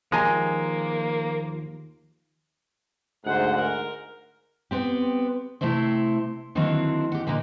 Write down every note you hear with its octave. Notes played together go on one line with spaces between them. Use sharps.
D#2 F3 G#3 A#3 D#4 G#5 A#5
D2 G#2 C5 F#5
A#4
B3 C4 G4
C3 A3 C4 E4 C5
D3 D#3 F#3 A#3 C4 E4
G4 F#5
A#2 D3 A#3 D#4